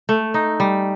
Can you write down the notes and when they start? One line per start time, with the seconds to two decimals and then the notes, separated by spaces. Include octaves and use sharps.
0.09 A3
0.34 D#4
0.60 G3